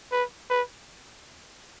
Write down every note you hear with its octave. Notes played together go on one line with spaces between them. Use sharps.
B4
B4